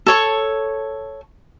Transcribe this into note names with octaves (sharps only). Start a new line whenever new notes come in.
A4 C#5 C#6